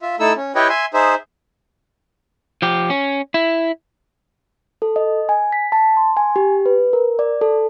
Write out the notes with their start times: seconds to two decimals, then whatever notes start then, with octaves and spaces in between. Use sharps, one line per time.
0.02 F4 E5
0.20 A3 D#4 E4 A4 E6
0.36 C#4
0.55 E4 G4 B4 C#5 D#5 G5
0.69 E5 G#5 C6
0.94 D#4 G#4 C5 E5
2.62 F3 G4
2.90 C#4
3.34 E4
4.82 A4
4.96 D#5
5.29 G#5
5.52 B6
5.72 A5
5.97 C6
6.17 G#5
6.36 G4
6.66 B4
6.93 A#4
7.19 D5
7.41 A4